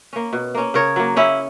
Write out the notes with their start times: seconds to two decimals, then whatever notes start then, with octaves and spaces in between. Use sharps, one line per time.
0.13 A#3 C#4
0.33 B2
0.55 A#3 C#4
0.74 C#3 A#4 C#5
0.96 F#3 A#3
1.16 C#3 C#4 E4